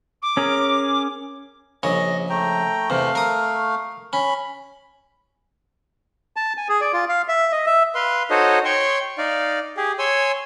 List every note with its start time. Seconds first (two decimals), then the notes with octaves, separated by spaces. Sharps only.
0.22 D6
0.37 C#4 G#4 A#4
1.83 A#1 C#3 C#5 D#5
2.30 A3 G5 A#5
2.90 E2 C3 A3 F5
3.15 A#4 D#6
4.13 C#4 B5
6.36 A5
6.57 G#5
6.69 G#4
6.81 D5
6.93 F4
7.09 F5
7.28 E5
7.52 D#5
7.66 E5
7.95 B4 F5 C6
8.30 D#4 F#4 A4 C5 C#5 D#5
8.65 C#5 G5 C6 C#6
9.18 D#4 D5 F5
9.77 G4 G#4
9.99 C#5 G#5 C6 E6